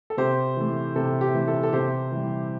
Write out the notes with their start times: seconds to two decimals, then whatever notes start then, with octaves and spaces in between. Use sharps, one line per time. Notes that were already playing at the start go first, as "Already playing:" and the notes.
0.10 A4
0.17 C3 G4 C5
0.57 E3 A3
0.96 C3 A4
1.21 G4
1.34 E3 A3
1.48 A4
1.63 A4
1.73 C3 G4 C5
2.12 E3 G3